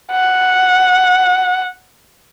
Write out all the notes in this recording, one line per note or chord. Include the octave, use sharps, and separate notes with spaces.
F#5